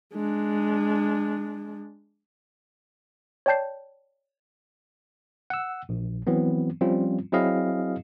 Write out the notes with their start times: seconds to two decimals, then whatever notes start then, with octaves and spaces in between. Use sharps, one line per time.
0.14 G#3 D4
3.46 C#5 D5 G5 A5 G6 C7
5.50 F#5 E6
5.89 A#1
6.27 E3 F#3 B3 C4
6.81 F3 G3 C4 C#4 F4
7.32 F#3 C4 E4 G#4 D#5 F5